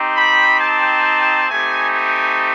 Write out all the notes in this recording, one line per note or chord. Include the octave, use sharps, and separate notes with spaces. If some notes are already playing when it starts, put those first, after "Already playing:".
Already playing: C4 D#4 G4
B5
A5
A3 C4 D#4 G4 G#5
G#5